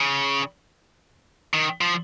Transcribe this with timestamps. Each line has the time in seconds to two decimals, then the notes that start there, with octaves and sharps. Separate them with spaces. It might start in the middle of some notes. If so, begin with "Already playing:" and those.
Already playing: C#3
1.54 D#3
1.81 F3